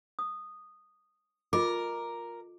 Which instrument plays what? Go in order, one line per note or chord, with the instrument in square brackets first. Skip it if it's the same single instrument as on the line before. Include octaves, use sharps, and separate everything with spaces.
[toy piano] D#6
[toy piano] F4 D#5 D6 [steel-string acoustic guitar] A#4